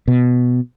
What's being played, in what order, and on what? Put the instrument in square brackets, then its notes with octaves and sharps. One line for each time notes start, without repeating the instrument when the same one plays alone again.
[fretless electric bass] B2